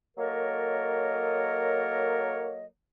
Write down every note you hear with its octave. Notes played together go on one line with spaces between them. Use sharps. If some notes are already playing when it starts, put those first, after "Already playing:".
F#3 A#3 A4 A#4 C#5 D#5